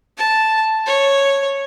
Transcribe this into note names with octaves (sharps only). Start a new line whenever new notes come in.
A5
C#5